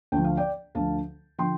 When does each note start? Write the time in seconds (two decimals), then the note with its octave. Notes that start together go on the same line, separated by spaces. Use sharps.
0.12 D2 D3 F3 G5
0.24 F5
0.37 D5 G5
0.75 D2 D3 F3 F5 A5
1.38 D3 F3 G5 C6